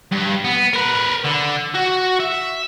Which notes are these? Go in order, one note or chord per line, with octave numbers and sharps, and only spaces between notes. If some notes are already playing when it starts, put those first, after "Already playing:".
G2
B3
A#4 B4
D3
F#4
E5